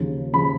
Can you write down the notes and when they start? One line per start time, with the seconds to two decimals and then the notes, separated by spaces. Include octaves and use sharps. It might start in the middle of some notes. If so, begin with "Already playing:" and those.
Already playing: D#2 C#3 F3
0.33 C#3 F3 B5